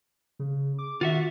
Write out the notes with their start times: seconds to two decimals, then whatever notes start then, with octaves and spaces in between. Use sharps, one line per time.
0.39 C#3
0.79 D6
1.01 D#3 F4 F#4 E5